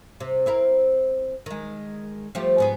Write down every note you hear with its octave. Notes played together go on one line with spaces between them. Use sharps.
C3
C4 E4 A#4
D#3 G#3
F3 A3 G4
G#2 B3 G#4